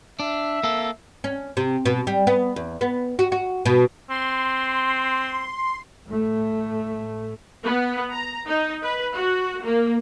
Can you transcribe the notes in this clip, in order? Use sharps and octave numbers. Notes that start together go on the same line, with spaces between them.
D4 E5
A#3 A4
C#4
C3
B2
G3
B3
E2
B3
F#4
F#4
B2
C4 C6
A2 A3
B3
A#5
D#4
B4
F#4
A#3